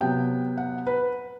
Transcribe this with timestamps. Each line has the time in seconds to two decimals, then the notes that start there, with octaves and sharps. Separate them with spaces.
0.01 C3 F#3 B3 G5
0.57 F#5
0.87 B4